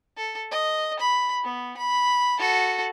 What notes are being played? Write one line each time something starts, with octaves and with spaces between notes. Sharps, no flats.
A4
D#5
B5
B3
B5
F#4 A4